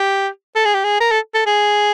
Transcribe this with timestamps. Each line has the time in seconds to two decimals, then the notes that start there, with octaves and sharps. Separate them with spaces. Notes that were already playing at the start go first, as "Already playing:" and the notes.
Already playing: G4
0.56 A4
0.65 G#4
0.74 G4
0.84 G#4
1.00 A#4
1.11 A4
1.34 A4
1.46 G#4